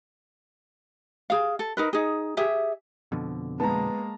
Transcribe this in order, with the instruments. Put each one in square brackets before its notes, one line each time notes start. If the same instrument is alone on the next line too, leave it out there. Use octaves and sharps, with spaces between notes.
[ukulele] G#4 F5
A4
D#4 A#4 B4
D#4 G#4
G4 G#4 E5
[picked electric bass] F2 B2 D3
[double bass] G#3 A#3 [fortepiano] B3 [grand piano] A5 A#5